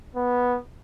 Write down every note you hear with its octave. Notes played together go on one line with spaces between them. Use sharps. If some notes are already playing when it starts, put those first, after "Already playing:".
B3